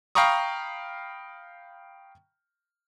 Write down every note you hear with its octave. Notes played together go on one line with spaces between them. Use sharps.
F5 G5 A#5 B5 C#6 D#6